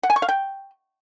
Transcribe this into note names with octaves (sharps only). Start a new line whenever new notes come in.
F#5
G#5
C#6
F5
G5